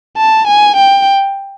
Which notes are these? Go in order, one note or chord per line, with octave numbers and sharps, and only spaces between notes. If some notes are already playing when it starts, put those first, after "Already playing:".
A5
G#5
G5